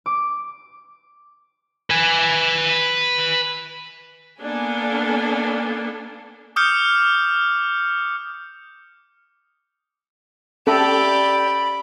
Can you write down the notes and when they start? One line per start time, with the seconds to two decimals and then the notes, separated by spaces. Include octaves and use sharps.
0.06 D6
1.90 B4 G#5
4.41 A#3 B3 D4 A4 G#5
6.56 D6 D#6 F6 G6 C#7
10.67 C#4 G4 A4 D5 E5 A5 B5